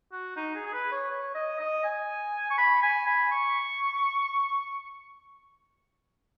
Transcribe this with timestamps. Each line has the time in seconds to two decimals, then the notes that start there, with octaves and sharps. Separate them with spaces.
0.12 F#4
0.36 D#4
0.55 G#4
0.66 G#4
0.73 B4
0.92 C#5
1.10 C#5
1.35 D#5
1.59 D#5
1.84 G#5
2.50 C#6
2.58 B5
2.82 G#5
3.07 B5
3.31 C#6